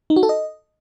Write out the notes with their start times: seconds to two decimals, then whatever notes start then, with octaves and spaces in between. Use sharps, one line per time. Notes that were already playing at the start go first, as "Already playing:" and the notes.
0.10 D#4
0.16 F#4
0.23 A4
0.29 D#5